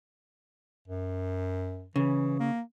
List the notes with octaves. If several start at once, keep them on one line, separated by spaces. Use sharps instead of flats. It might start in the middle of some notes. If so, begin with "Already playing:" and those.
F#2
C#3 E3
A#3